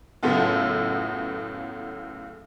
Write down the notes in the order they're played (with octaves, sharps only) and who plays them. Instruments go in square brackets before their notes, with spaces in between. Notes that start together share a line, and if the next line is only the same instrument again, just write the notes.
[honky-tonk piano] F#2 A2 C#3 A3 B3 F4